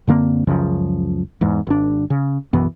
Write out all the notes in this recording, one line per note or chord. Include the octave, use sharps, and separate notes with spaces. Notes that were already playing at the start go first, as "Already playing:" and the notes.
F#2 D3 A#3 C4
C#2 F#2 C#3 F3
E2 G#2
G#1 D4
C#3
B1 F#2 E3 B3